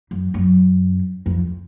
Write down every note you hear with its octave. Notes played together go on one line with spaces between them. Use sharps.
F#2
F#2
F2